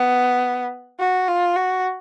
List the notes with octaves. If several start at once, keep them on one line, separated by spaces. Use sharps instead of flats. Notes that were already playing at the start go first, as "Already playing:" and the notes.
Already playing: B3
F#4
F4
F#4